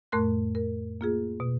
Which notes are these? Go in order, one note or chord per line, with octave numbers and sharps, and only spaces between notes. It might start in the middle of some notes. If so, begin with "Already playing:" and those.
F2 A2 A3 A#4 C6 F#6
A#4
A#3 F4 G#4
B2